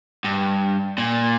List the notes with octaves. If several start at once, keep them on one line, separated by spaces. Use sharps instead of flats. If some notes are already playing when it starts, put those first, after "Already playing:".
G2
A#2